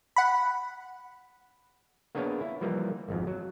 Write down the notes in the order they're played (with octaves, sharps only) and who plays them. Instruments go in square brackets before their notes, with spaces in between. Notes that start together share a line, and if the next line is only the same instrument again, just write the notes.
[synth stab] F#5 B5
[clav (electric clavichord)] A#3 B3 D4 G#4 C#5 F5
E4
E3 F3 G3 A#3
G#1 F2
F#3